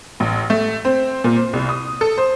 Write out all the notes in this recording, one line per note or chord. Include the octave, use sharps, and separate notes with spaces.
A1
A3
C4
A#2
C5
C2
D#6
A4
C5